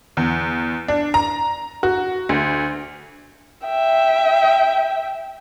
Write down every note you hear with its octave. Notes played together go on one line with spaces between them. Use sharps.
E2
D4
A#5
F#4
D2
E5 G5